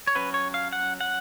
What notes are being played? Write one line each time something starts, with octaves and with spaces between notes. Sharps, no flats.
C#5
F#3 C#4 B4
C#5
F5
F#5
F#5